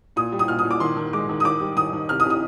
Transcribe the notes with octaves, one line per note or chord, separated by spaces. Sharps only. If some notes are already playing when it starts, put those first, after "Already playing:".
A#2 D#6
G3
D#6
A#2 F6
D#6
A#2
D6
D#3 C6
D#3
G#3 D6
D#3
D#6
D#3 D6
G3
D#3 D#6
D#3
C3 F6
D#6
C3
D#6